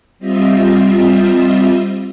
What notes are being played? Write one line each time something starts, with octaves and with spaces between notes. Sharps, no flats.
G3 C4 F4 D#5 E5